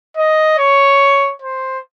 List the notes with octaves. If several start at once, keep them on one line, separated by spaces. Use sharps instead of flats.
D#5
C#5
C5